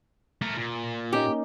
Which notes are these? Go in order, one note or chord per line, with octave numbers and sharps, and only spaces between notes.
A3 A#4
A#2
A#3 C#4 D#4 G4